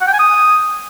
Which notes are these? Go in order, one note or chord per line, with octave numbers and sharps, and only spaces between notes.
F#5
G5
G#5
D#6